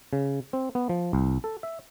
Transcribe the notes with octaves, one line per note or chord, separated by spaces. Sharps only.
C#3
C4
B3
F3
C2
A4
E5